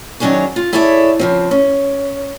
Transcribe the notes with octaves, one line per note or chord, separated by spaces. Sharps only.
D#3 F#3 C#4 D4 G#4 C#5
F4
E4 G#4 A4 C#5 D5 E5
C#3 F3 C4
C#4